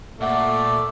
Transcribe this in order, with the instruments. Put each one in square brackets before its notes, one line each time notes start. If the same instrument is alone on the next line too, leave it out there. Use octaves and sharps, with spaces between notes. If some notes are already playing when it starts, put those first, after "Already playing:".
[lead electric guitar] A#2 [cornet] A3 [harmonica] D5 [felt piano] E5 F#5